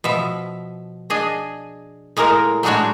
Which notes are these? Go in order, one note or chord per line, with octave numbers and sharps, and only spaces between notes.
B2 F3 E5
D4 G#4 D#5
A2 G#3 A#3 A#4 A#5
F#3 G#3 A3 D4 F#4 C#5